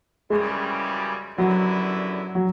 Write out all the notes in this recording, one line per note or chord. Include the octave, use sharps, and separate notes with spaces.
F#2 C#3 E3 G3 G#3
F#2 D3 F#3 G3 B3 E4
F#3